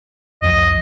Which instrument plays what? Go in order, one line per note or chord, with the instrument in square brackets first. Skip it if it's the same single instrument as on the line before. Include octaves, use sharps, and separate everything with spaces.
[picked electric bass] F1 C2 F3 [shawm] D#5